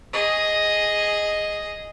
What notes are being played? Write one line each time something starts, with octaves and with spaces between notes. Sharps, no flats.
G#4 D#5